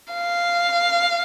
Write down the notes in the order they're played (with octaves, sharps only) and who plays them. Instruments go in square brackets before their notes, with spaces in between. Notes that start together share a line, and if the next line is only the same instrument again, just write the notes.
[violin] F5